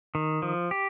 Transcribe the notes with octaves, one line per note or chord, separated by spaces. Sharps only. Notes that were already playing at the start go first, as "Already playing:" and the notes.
D#3
F3
G4